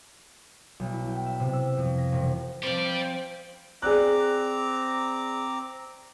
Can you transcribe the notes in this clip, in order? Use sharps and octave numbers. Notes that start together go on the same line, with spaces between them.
B1
E4
G5
E5
C3
E6
F2
A#6
E1
F3 C4 G4 C5 D5
C4 G#4 D5 A#5 D6 F#6